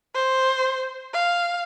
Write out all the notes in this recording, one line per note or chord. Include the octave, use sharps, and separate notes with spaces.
C5
F5